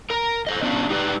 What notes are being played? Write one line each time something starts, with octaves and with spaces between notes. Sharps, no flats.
A#4 A#5
A4 C5 D#5
B3 C#4 D4 F4
D#4 G4 A#4 B4 D5